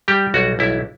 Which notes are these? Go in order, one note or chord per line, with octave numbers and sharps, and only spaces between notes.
G3 G4
B1 F#4
B1 E4